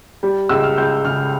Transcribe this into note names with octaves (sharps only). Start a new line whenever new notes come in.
G3
C#2 E6
F6
C#2 G6
C#3 F6